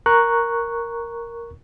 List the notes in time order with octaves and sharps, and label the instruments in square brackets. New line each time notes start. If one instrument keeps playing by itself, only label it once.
[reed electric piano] A#4 A#5 C#6 F#6